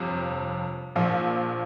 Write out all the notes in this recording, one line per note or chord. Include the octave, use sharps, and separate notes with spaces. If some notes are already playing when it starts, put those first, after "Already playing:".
Already playing: G1 F2 C3 F3
A#1 A#2 F3